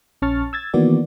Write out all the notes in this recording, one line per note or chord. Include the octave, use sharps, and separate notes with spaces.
A#1 C#4 A5 C#6 F6 A6
E6 G#6 A6
D#3 E3 A#3 B3 F#4 D5